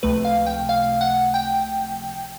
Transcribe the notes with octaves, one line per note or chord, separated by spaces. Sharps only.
C#2 C3 F3 A3 B4
F5
G5
F5
F#5
G5